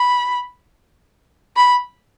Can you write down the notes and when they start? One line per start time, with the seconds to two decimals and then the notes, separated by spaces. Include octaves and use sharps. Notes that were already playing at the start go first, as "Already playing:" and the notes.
Already playing: B5
1.57 B5